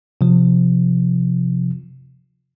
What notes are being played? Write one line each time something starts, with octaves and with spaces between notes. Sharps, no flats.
C3 F3